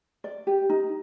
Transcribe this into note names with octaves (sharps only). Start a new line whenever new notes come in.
D5
G4
D#4